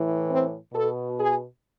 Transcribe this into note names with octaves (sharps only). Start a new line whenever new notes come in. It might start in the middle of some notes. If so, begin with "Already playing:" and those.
Already playing: A2 E3
C4
B2 A4
G#4